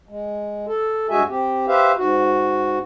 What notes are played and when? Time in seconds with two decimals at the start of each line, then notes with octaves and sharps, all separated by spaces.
0.09 G#3
0.67 A4
1.10 G2 G#3 F#4 G#4 E5 G#5
1.29 C4 G4
1.68 G4 B4 C5 E5 F5
1.97 G#2 F#4